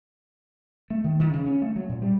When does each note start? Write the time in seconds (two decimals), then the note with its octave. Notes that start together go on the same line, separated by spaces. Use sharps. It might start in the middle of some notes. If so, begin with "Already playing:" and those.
0.90 A3
1.04 D#3
1.19 D#3
1.33 C#3
1.46 C#4
1.62 A3
1.76 F#3
1.89 A#2
2.02 G3